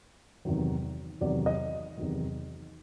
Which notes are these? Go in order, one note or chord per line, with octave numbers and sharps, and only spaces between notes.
E2 C3 D#3 F#3
E2 C3 D#3 F#3 D5
D#5
E2 C3 D#3 F#3